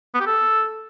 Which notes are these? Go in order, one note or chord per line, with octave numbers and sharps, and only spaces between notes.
B3
G4
A4